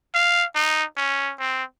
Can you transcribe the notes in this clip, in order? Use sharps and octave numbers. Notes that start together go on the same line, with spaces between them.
F5
D#4
C#4
C4